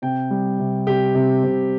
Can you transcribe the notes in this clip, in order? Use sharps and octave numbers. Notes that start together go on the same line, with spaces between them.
C3 G5
G3
C3
C3 G4
C3
C3